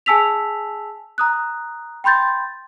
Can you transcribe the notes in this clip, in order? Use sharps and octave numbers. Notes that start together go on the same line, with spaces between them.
G#4 G#5 A5 E6 B6 F7
A#5 D#6 F#6
G5 B5 C6 G6 A6